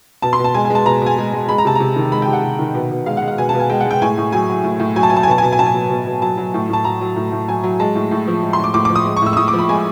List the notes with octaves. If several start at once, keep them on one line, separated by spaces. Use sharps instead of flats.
B2 A5
C6
B2
A5
G#3 G#5
G#5
G#3
A5
B2 A#5
B2 G#5
G#3
G#3
G#3 B5
A#5
C3 A5
C3 A#5
D#3
G#3 B5
G5
C3
F#5
C3
D#3
B2
B2
G#3 F5
F#5
G#3
F#5
B2 G#5
A5
B2 G#5
G#3 G5
F#5
G#3
G5
A2 G#5
A2
F#3 G#5
F#3
A2
A2
F#3 G#5
A5
F#3 G#5
A5
G#5
B2 A5
G#5
B2 A5
G#5
F#3 A5
G#5
F#3
B2
B2
F#3 A5
F#3
A2
A2 A5
F#3 A#5
F#3
A2
A2
F#3 G#5
F#3
G#3 A5
A2
A2
F3
G#3
C6
A2
D6
A2 D6
D6
F3
D#6
G#3
C#6
A2 E6
E6
A2 D#6
D6
F3
B5
G#3 G#5